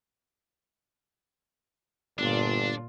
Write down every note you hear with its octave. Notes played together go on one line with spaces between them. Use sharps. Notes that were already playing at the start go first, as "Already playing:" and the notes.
G1 A#2 D4 F4